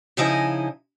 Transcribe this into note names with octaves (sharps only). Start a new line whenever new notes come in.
C#3 F3 D#4 E4 D#5 G#5